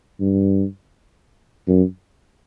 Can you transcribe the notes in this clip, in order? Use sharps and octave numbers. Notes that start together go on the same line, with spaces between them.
G2
F#2